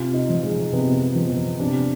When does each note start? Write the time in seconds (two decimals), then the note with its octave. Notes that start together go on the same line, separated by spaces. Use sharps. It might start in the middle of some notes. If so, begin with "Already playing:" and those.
Already playing: C3 F4
0.14 D#4
0.29 F3
0.43 G#3
0.73 C3 B3
1.15 F3 B3
1.59 C3 D4